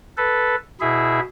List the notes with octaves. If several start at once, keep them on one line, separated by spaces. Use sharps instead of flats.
A4 B4
B2 E4 G#4 E5